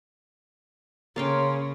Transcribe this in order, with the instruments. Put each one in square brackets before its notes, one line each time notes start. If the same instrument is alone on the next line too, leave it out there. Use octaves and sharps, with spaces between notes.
[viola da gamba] C#3 [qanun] A#3 F5 G5 [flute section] C#5 C6